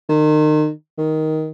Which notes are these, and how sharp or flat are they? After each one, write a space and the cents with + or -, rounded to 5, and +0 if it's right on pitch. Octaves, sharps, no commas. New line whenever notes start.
D#3 -30
D#3 +10